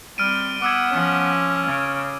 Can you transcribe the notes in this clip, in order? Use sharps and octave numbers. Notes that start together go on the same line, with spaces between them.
G3 C4 F6 D7 D#7
B3 B4 F#5 D6 E6 G#6
F3 C#4
C#3 C#5